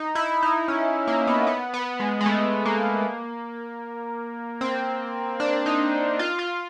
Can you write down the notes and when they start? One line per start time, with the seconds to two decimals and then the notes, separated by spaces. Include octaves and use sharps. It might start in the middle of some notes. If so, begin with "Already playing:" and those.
Already playing: D#4
0.15 E4
0.43 D#4
0.68 C#4
1.07 A#3
1.27 B3
1.47 B3
1.74 B3
2.00 G#3
2.21 G#3
2.26 A3
2.65 A#3
4.61 C4
5.40 D4
5.66 D#4
6.19 F4
6.39 F4